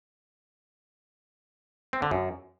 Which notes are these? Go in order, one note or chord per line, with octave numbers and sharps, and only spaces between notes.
C4
D3
F#2